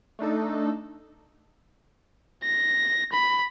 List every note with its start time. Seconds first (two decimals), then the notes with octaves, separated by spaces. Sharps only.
0.19 A3 D4 D#4 A4
2.43 A#6
3.12 B5